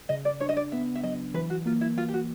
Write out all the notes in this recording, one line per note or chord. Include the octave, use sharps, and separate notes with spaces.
C#3 D#5
D5
D4 C#5
D#5
D5
B3 E5
E5
F#3 D#5
E3 B4
F#4
A#3 F4
E4
A#3 F4
G4
F#4